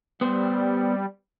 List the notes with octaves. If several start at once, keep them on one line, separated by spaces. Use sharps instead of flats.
G3 B3 C5